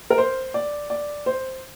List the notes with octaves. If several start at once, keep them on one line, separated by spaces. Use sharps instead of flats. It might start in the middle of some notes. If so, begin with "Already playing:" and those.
A#4
C5
D5
D5
C5